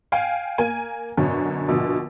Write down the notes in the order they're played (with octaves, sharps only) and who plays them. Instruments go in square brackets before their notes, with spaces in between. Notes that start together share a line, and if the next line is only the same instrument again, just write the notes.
[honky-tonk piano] F5 G5 G#5
A#3 A#4 G#5 D#7
F#2 B2 D3 C#4
A#1 B2 D3